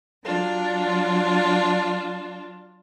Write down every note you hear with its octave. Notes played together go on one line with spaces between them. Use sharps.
F#3 D4 F4